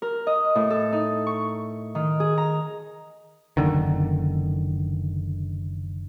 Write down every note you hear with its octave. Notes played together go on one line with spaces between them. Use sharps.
A#4
D#5
A2
A4
D#4
C#6
D#3
G#4
A#5
F#1 D3 D#3